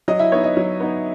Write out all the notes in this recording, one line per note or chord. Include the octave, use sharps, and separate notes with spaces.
F#3 D#5
E4 E5
B3 D#4 C#5
D#5
F#3
B3 D#4